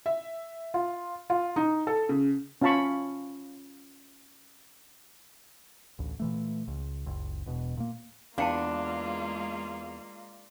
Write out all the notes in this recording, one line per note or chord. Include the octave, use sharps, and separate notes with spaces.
E5
F4
F4
D#4
A4
C#3
C#4 F4 F5 A5 B5 C#6
A1 D2
A#2 E3 A3
C#2
F#1 C#2
E1 B2
A#2 A#3
E2 G#3 A#3 D4 F4 F5 G5 A5